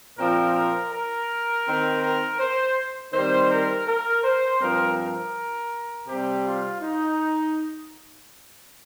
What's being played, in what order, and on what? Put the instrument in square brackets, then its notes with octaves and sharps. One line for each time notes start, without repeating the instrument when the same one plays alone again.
[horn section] A#2 F3 C4 A#4
A#4
A#4
D#3 C4
A#4
C5
D#3 G3 C4 C5
A#4
A#4
C5
G2 F3 C4 A#4
A#4
C3 G3 C4 G4
F4
D#4